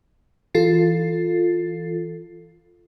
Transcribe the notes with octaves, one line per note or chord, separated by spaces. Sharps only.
E3 F4 A4 A6 C7